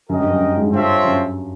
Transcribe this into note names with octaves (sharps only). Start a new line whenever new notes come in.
F#2 F#4 A#4 D#5 G5
G2
F#2
G2
G#2
G2 C4 F4 A4 C#5 E5
F#2